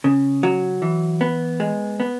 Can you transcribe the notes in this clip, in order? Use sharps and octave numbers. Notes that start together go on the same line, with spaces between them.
C#3
F#3
E3
B3
G#3
B3